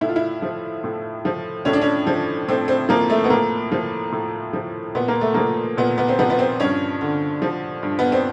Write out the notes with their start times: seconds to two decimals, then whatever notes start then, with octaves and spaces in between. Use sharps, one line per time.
0.01 A2 E4
0.09 F4
0.16 E4
0.42 F3
0.84 A2
1.25 F3
1.65 A2 C#4
1.73 D4
1.81 C#4
2.07 F3
2.48 A2 C4
2.68 C4
2.89 F3 A#3
3.10 A3
3.24 B3
3.30 A2 A#3
3.72 F3
4.12 A2
4.53 F3
4.95 A#2 B3
5.08 A#3
5.21 A3
5.34 F3 A#3
5.77 A#2 B3
5.98 B3
6.08 C4
6.19 F3 B3
6.30 B3
6.39 C4
6.60 G2 C#4
7.01 D3
7.42 F3
7.83 G2
7.99 B3
8.12 C4